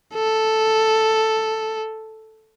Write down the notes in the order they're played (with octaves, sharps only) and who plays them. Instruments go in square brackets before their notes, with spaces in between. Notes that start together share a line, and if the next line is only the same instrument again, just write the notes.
[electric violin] A4